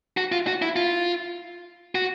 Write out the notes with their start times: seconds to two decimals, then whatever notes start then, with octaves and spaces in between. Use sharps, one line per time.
0.17 F#4
0.32 F4
0.47 F#4
0.62 E4
0.76 F4
1.95 F#4